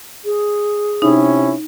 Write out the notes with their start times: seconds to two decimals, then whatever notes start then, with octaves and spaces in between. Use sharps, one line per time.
0.25 G#4
1.02 C3 C#4 D#4 E4